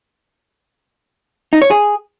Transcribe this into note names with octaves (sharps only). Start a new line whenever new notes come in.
D#4
C#5
G#4